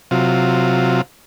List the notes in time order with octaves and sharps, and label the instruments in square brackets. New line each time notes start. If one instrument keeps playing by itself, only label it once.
[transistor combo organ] C3 F#3 F4